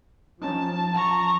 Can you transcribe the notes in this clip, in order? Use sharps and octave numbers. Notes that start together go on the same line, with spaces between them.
F3 C#4 D#4 A5
F3 A#5 C#6